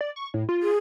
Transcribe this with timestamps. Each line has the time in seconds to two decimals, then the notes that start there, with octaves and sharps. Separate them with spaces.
0.01 D5
0.16 C#6
0.34 A2
0.49 F4
0.63 G#4